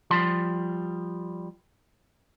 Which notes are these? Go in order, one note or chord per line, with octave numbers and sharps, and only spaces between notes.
F3 G3 A5 C6